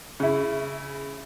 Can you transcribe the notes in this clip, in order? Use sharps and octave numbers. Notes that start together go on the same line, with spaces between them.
C#3 E4